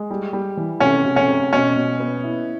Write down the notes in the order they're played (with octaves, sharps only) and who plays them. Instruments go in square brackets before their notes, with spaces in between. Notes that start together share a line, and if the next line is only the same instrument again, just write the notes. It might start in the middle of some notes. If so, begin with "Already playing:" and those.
Already playing: [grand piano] G#3
G3
G3
E3
[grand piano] C3 [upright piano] C#4
[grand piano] C3
[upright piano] C#4
[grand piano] C3
[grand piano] B2 [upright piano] C#4
[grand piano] B2
B3
E4